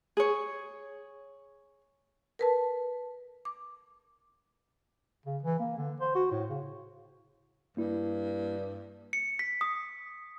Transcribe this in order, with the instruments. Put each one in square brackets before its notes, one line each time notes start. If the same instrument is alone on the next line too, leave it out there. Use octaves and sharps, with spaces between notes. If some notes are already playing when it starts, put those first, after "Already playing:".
[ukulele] G#4 C#5
[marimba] A#4 B4 A5
D6
[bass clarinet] C#3
E3
A#3
D3
C5
F#4
A2
C#3
[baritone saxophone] G2 [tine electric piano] A#3 E4
[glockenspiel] C#7
B6
D#6